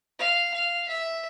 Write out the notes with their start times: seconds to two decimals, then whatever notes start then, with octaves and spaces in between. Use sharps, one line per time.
0.19 F5
0.54 F5
0.89 E5